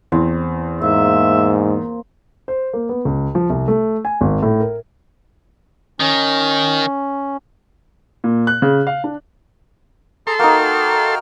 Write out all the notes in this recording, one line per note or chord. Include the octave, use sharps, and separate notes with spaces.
E2 C4
G#2 A#3 E5
C5
A#3
B3
C#2
F3
C2
A3
G#5
G#1
A2
A#4
D#3 C#4
A#2
F#6
C#3
F5
D4
G#4 A4 A#5 C6
A#3 D#4 F#4 G5 F6